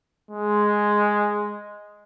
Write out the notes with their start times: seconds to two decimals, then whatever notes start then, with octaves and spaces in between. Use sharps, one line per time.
0.31 G#3